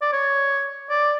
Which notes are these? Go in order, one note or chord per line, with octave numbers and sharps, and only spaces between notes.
D5
C#5
D5